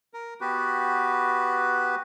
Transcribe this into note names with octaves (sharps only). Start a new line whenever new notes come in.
A#4
B3 F#4 G4 B4